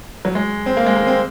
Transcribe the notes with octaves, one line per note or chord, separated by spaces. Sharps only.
F#3
G#3
C4
A#3
G#3
A#3
C4